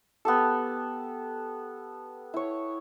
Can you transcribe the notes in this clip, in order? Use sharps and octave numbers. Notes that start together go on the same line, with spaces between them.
B3 G4 A4
E4 C#5